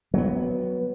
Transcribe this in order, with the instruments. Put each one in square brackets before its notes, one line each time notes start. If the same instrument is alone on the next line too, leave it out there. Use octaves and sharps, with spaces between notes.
[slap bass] F#3 B3